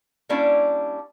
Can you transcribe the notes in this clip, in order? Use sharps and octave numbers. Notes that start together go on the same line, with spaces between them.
G3 A#3 C#4 D4 E4 D5